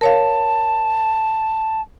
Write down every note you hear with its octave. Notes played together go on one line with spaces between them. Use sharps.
A#4 C#5 F5 A5